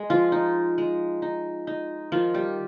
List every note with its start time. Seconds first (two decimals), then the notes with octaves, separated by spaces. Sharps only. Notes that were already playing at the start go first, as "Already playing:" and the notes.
Already playing: G#3
0.10 F3 F4
0.32 D#4
0.78 G#3
1.22 D#4
1.67 D#4
2.12 D#3 F3 F4
2.34 G3 G4